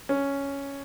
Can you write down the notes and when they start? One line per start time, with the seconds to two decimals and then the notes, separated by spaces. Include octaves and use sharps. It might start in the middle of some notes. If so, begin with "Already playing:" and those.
0.09 C#4